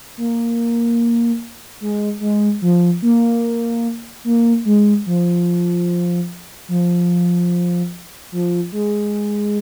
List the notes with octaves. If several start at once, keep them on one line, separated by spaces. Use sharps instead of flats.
A#3
G#3
G#3
F3
A#3
A#3
G#3
F3
F3
F3
G#3